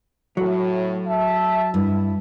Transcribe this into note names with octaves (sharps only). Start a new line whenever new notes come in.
A2 F#3
E5 A5
G2 E4